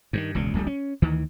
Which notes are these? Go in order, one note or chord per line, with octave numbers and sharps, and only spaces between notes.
G2 D3 D#3
E1 C#2 A#2
D1 A#1 G3 A3
C#4
D2 D#3 E3